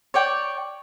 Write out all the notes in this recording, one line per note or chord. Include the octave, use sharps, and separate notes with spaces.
C#5 D5 G5